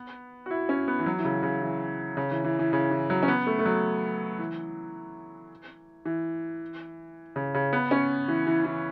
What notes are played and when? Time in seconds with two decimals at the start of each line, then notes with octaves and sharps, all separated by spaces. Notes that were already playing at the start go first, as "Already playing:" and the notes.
Already playing: B3
0.46 F#4
0.51 E4
0.69 C#4
0.88 B3
0.99 E3
1.06 F#3
1.19 E3
1.25 C#3
1.43 C#3
1.61 E3
2.17 C#3
2.31 E3
2.44 E3
2.59 E3
2.73 C#3
2.91 E3
3.10 F#3
3.23 C#4
3.28 B3
3.47 A3
3.59 A3
3.66 F#3
4.39 E3
6.05 E3
7.36 C#3
7.55 C#3
7.73 B3
7.91 C#4
8.28 E3
8.47 E3
8.65 E3